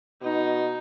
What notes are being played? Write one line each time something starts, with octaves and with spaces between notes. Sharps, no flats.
B2 D#4